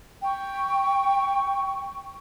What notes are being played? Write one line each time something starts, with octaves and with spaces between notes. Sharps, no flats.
G5 C#6